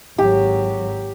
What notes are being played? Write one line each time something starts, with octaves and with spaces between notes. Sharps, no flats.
G#1 F#3 G4